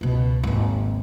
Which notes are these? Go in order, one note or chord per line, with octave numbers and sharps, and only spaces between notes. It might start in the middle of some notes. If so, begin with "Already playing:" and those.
C#2 B2
G#1 D#2